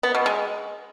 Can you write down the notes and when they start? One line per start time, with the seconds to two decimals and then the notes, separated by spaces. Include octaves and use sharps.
0.03 B3
0.15 B2
0.26 G#3